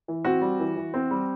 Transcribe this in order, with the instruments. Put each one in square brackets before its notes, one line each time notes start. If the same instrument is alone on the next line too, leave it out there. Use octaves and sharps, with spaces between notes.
[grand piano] E3
C4 F#4
G3
E3
E3
C4
G3